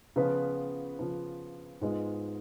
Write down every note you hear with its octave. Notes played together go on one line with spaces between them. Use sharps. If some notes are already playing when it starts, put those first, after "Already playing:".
C#3 F3 B3 F4 B4
C#3 F3 B3 F4 B4
G#2 G#3 B3 F4